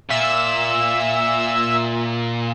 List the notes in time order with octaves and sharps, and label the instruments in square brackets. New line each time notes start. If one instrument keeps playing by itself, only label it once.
[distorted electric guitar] A#2 [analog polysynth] E5 E6